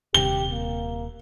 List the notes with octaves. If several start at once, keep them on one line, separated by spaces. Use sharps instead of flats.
D#1 C3 G4 G7
A#3